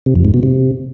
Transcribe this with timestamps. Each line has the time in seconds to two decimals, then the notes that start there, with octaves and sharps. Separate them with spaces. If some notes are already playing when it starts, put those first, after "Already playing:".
0.06 C3
0.15 F2
0.25 G#2
0.34 B2
0.43 C3